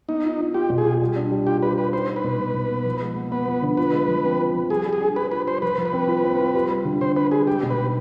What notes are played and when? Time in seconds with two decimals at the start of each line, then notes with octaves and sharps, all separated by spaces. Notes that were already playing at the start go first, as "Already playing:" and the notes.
0.09 B3 D#4
0.24 F4
0.40 F4
0.54 F4 G4
0.70 B2
0.78 G#4
0.86 F4
1.01 G3
1.16 D4
1.31 G3
1.47 F4 G4
1.62 G3 B4
1.77 G3 B4
1.93 D#4 C5
2.09 D#4
2.16 B4
2.24 B2
2.40 B2
2.54 B2
2.71 B3
2.86 F3
3.01 G#3
3.16 B3
3.31 B3 B4
3.47 F3
3.62 D3
3.77 F4 B4
3.93 G#3
4.08 F3
4.24 C4
4.40 F4
4.55 F3
4.70 G3 G#4
4.86 G3
4.93 G#4
5.01 D4
5.16 D4 B4
5.32 F4 B4
5.48 G3 C5
5.62 F3 B4
5.78 F3
5.85 B4
5.93 C4
6.08 F4
6.24 C4
6.40 F4
6.55 G3
6.70 G3
6.85 D3
7.01 D3 C5
7.16 D4 B4
7.31 G3 G#4
7.47 G#3 G4
7.63 B2
7.70 B4
7.78 D#4